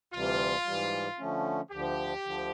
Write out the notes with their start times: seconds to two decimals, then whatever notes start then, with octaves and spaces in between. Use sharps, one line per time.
0.13 D2 C3 E3 G3 F4
0.65 G#2 E3 G3
1.19 D3 F3 A3 C#4
1.71 D2 D3 F3 G4
2.24 D2 D3 F3